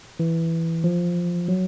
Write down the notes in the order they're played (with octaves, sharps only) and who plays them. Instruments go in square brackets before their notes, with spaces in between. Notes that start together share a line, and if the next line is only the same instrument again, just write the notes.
[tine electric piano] E3
F3
F#3